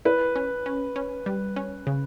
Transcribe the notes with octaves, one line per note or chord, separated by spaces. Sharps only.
E4 B4
C#4
C#4
C#4
G3
C#4
C#3